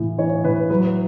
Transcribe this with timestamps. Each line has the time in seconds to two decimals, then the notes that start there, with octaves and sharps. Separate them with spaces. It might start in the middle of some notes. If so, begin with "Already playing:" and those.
Already playing: A2 E3
0.18 E3 C#5
0.44 A2 B4
0.70 F#3 B4